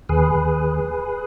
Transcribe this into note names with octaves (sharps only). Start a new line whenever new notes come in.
D#2 G#4 B4
D#2